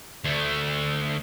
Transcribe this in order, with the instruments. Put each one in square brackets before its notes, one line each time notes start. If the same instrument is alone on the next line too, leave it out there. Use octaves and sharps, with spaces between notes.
[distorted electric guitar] D2 A3